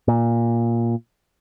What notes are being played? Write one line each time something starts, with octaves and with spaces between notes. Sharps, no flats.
A#2